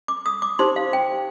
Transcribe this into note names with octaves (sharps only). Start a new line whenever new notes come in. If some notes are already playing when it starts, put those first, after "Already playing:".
D6
D#6
D6
D#4 G4 C5 C6
F5
G5